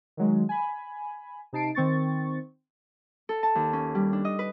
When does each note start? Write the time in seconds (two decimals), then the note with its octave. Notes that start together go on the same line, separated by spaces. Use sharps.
0.17 D#3 F#3 G#3
0.49 G#5 B5
1.53 C3 D#4 A5 C7 D7
1.75 D#3 C4 C#6 A6
3.29 A4
3.43 A5
3.55 D#2
3.73 C#4
3.95 G3
4.13 D4
4.25 D#5
4.39 B4